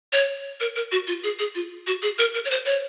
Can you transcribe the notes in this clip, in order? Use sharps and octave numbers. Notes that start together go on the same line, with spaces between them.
C#5
A#4
A#4
F#4
F4
G#4
G#4
F4
F#4
G#4
A#4
A#4
C#5
C5
C#5